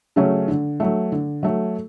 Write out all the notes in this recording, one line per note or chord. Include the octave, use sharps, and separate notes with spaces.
C#3 F#3 A3 C#4
D3
F#3 A3
D3
F#3 A3